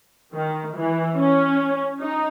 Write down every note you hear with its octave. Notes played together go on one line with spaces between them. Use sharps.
D#3
E3
C#4
D#4